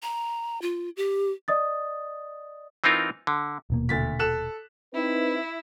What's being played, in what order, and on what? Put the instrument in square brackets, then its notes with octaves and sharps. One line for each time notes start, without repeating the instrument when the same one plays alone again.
[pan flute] A#5
F4
G4
[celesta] D5 D#5 D#6 A6
[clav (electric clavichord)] E3 C4 D#4 F4 A#4
D3
[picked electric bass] D#1 B2 A#3
[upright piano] D2 A6 B6
A4 F#6 E7
[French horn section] C4 D#4 B4 [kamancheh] E4